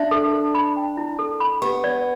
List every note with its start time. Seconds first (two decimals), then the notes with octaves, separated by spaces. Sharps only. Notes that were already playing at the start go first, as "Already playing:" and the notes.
Already playing: D4 E5
0.11 A4
0.33 A4
0.55 B5
0.76 G5
0.97 E4
1.19 A4
1.40 B5
1.62 B3 G4
1.84 D5